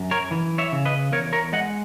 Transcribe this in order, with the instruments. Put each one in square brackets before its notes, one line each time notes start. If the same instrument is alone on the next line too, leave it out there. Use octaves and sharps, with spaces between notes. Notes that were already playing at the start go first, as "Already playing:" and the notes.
Already playing: [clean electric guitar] F#2
A#4 C#5
E3
C#5 E5
C#3
B4 D#5
E2 A#4 C#5
A#4 C#5
G#3 D#5 F#5